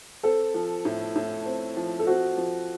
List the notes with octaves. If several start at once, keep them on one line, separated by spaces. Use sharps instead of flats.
C4 A4
F3
A2
A2
C4
F3
A4
C4 F#4
F3